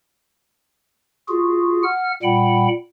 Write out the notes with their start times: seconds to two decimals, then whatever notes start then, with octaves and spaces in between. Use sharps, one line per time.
1.29 F4 F#4 G#4
1.84 F#5 F6
2.23 A#2 G3 F#5 G5 B5